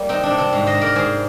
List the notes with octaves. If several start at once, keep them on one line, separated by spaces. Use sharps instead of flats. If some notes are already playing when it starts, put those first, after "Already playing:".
Already playing: G3 A#3
C3 C4 D#4
D4
C3
C4
G#2
C5 D#5
G#2
A#4 D5
G#2 G#4 C5